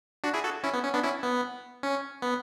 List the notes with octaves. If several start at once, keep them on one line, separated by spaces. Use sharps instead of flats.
D4 F#4
E4 G#4
F#4 A4
C#4 E4
B3
C#4
B3 D4
C#4 E4
B3
C#4
B3